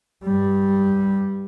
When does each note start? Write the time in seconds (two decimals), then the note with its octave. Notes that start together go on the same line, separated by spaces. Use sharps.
0.23 G2 G3